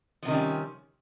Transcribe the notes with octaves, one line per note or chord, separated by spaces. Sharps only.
C3 D#3 F3 G3 C#4